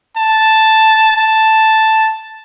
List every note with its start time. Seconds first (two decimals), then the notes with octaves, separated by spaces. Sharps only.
0.17 A5
1.17 A5